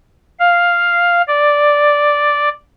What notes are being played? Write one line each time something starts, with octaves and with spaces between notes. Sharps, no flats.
F5
D5